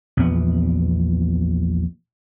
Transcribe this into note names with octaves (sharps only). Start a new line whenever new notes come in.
A#1 E2 B3